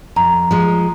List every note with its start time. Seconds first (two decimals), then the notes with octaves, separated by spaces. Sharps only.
0.16 F2 A#5
0.51 F3 G#3